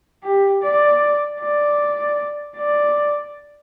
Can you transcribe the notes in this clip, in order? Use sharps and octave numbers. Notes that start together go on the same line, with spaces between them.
G4
D5
D5
D5